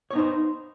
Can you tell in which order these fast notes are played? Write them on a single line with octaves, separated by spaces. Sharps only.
C#5 B3 D#4 C5